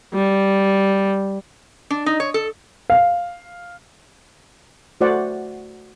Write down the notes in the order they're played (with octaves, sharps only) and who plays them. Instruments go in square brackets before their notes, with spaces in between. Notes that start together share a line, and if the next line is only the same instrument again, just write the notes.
[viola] G3
[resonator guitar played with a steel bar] D4
D#4
C#5
A4
[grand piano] F5
[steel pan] A3 F#4 C5 D5 F#5